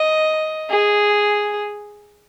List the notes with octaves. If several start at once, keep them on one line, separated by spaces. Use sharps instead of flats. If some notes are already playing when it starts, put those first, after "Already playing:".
Already playing: D#5
G#4